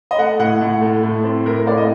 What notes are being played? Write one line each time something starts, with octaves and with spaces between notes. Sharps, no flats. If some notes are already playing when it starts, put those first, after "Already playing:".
D#5
A3 F#5
A2 F#5
A2
A3
A2
C4
A2 A#4
A#4
A2 D5
D#5